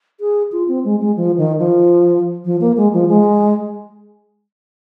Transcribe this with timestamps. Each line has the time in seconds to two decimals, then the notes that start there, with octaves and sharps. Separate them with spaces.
0.20 G#4
0.52 F4
0.68 C4
0.85 G#3
1.01 G#3
1.17 F3
1.38 D#3
1.59 F3
2.45 F3
2.61 A#3
2.77 G#3
2.93 F3
3.09 G#3